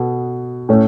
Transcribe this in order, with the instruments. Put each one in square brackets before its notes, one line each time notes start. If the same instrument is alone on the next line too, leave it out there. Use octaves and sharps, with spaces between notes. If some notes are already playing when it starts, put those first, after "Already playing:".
Already playing: [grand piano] B2 B3 A4
A2 A3 C#4